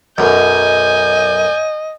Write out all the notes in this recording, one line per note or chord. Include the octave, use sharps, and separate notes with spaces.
B1 F#2 D#5 G#5 G6